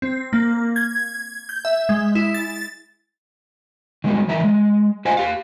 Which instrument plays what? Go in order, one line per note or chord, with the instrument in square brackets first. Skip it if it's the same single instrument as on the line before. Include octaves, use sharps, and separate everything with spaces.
[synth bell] C4
A#3
G#6
G6
E5
G#3
E4
A6
[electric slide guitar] D#3 G3 G#3 B3 F#4
D#3 E3 E5 A#5
G#3
F4 B4 C5 D#5 F5 G#5
G4 F5